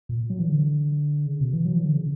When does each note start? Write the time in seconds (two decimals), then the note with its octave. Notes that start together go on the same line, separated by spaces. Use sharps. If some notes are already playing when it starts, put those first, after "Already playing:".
0.09 A#2
0.30 F#3
0.39 E3
0.49 D3
1.26 C#3
1.40 B2
1.53 E3
1.65 F#3
1.76 E3
1.85 D3
1.95 C#3